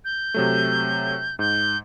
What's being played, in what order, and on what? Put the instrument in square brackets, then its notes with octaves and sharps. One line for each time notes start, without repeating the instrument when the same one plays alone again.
[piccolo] G6
[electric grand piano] C3 F#3 A3
[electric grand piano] G#2 [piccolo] G6